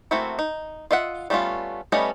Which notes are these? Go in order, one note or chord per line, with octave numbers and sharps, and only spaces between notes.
A3 A#3 C4 E4 F#4
D#4
F4 D#5 E5 F#5
G3 A3 B3 C#4 F4
G3 A3 B3 C#4 D#5